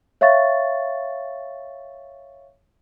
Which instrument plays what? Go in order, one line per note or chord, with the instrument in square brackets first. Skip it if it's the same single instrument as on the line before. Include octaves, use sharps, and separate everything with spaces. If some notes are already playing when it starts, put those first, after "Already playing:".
[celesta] C#5 E5 F5 C#6 A6